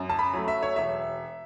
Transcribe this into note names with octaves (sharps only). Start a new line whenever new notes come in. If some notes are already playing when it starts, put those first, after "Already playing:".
Already playing: F#2
A5
B5
F#3 A3
E5
C#5
E1 E5